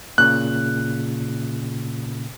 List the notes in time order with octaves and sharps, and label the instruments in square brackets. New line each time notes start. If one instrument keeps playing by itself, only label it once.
[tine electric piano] A#2 C#3 [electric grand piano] F#6